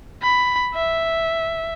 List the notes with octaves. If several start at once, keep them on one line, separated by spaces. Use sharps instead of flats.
B5
E5